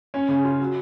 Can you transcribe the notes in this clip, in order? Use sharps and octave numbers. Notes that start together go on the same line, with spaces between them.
C#4
C#3
F4
F#3